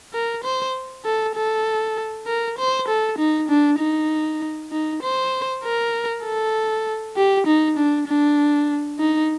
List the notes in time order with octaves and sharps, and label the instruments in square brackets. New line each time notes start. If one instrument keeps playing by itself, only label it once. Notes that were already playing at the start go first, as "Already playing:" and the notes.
[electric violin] A#4
C5
A4
A4
A#4
C5
A4
D#4
D4
D#4
D#4
C5
A#4
A4
G4
D#4
D4
D4
D#4